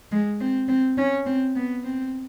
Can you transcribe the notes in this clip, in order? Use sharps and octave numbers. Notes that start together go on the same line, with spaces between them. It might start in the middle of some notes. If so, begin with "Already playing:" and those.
G#3
C4
C4
C#4
C4
B3
C4